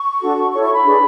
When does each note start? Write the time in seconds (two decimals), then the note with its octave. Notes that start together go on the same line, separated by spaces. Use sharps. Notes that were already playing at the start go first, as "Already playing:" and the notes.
Already playing: C#6
0.20 D4 F#4 A4
0.52 E4 A4 C#5 C#6
0.63 C#6
0.74 B5
0.84 D4 G#4 B4